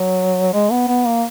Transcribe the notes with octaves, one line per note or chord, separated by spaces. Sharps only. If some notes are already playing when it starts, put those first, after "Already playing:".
Already playing: F#3
G#3
B3
B3
A#3